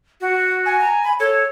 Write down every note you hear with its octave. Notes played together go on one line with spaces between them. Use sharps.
F#4
G#5
A#5
B5
A4 C#5